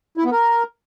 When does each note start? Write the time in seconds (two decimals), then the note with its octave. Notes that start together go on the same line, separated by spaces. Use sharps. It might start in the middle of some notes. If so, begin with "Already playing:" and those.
0.17 E4
0.25 B3
0.32 A#4